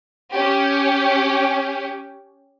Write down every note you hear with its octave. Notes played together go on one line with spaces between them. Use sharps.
C#4 G4